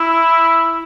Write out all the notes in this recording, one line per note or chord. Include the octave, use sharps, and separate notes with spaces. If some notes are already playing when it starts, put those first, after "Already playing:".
Already playing: E4